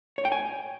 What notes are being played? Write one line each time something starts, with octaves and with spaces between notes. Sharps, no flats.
C#5
G5
G#5